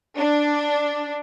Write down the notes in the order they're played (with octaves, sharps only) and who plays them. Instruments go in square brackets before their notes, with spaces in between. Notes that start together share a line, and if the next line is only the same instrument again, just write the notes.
[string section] D4